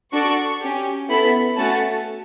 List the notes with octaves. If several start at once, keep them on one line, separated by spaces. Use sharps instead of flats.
D4 F#4 A4 C#6
C#4 G4
B3 E4 A4 B5
A3 C#4 F#4 A4 A5